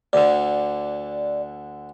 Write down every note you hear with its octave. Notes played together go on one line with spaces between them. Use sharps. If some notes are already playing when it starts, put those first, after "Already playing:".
D2 D3 D5